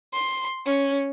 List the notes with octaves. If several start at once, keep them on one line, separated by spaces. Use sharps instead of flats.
C6
C#4